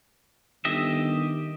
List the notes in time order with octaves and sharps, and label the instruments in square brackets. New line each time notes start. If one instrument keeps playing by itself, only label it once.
[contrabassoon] G1 [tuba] D#3 [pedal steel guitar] G4 D#5 E5